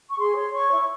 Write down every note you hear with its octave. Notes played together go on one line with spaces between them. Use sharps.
C#6
G#4 C6
C#5 C6
C#5 C#6
E4